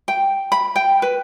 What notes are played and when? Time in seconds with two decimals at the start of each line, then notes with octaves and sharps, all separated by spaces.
0.08 G5
0.52 B5
0.76 G5
1.02 B4